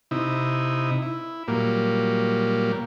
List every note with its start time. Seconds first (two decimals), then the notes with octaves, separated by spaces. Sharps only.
0.11 C3 D#4 E4
1.02 E4
1.48 A#2 F#3 G3 A#3